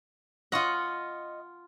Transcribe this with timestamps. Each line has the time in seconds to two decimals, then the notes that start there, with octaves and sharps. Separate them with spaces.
0.52 F4 D#5 F#5 C#6